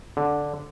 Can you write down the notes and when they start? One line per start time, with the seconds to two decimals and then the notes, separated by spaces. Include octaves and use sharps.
0.17 D3